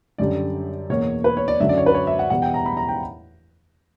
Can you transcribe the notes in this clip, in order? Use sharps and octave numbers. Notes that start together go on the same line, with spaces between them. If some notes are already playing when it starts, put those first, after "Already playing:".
F#2 D3 G3 D5
E2 B2 A#3 C#5
B4
C#5
D5
F#2 D3 F#3 C#4 E5
D5
C#5
B4
C#5
E5
F#5
E2 B2 G3 B3 F#5
G5
A#5
B5
A#5
G5